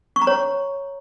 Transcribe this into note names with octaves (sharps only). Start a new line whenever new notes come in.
C#6
A#5
C#5